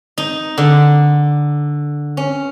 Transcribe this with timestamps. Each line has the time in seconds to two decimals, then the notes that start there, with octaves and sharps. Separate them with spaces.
0.18 D#4
0.58 D3
2.17 C#4